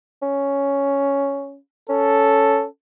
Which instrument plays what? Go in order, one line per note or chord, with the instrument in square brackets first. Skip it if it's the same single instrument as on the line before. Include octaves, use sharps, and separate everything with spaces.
[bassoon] C#4
[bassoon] C#4 [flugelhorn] A4